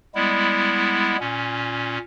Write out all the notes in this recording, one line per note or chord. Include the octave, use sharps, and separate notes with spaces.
G3 G#3 B3 E4
A#2 C#4